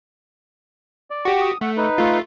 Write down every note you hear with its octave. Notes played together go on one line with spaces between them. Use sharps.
D5
F#4 G4
D#6
A3 F#5
D#4 B4
A3 F4